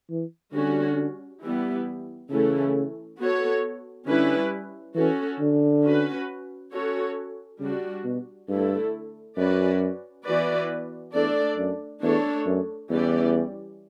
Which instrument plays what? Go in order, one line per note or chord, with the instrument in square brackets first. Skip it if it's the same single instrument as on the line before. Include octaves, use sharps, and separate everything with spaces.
[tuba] E3
[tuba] D3 [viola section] G3 C#4 F#4
[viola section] E3 G3 B3 E4 G4
[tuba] C#3 [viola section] E3 A3 C#4 E4 A4
[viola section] B3 F#4 A4 C#5
[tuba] D3 [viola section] G3 C#4 E4 B4
[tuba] E3 [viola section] C#4 F#4 A4
[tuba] D3
[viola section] C#4 F#4 B4
C#4 F#4 A4 C#5
[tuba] C#3 [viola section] G3 D4 F#4
[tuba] B2
[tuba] G2 [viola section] D3 A3 E4 A4
[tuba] F#2 [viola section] C#4 F#4 B4 D5
[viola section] E3 B3 F#4 B4 D5
[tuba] E2 [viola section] A3 D4 A4 D5
[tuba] F#2
[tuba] E2 [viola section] A3 D4 A4 C#5
[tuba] F#2
[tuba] E2 [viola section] E3 G3 C#4 G4 D5